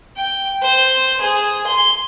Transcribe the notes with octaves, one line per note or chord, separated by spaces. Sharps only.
G5
C5
G#4
C6